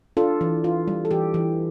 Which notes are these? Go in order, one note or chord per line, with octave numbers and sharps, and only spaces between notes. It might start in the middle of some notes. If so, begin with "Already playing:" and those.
D4 F4 A4
E3
F4
G3
A4
E3 G4
E3